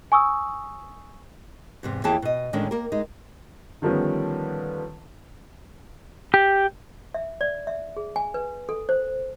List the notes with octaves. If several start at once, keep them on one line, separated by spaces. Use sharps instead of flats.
G#5 C#6 D#6 E6
E2 G#2 C3
D#2 E3 A#3 G#4 G5 A5
B2 D#5
A2 D3 D#3 G#3 C#4 D4
A#3 A#4
G#3 D#4
D3 D#3 F3 G3 B3 C#4
G4
E5
D5
E5
G#4
G#5
B4
A4
C5